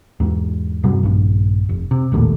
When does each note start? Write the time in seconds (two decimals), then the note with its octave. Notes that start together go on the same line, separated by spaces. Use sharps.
0.20 E2 G#2
0.84 G2 C3 F#3 G3
1.03 A#1 G2
1.69 F1
1.91 C3
2.12 E1 A#1 D#2 A2